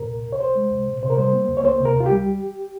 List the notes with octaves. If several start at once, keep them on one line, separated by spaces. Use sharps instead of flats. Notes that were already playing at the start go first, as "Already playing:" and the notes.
Already playing: A#2 A#4
C2
C2
C#5
C2 C5
G#3
C2
A#2
C3 C5
A#4
G3 C5
A#3
C#2
C#5
A#3 C5
C3
A#4
C#2
F4
G4
G3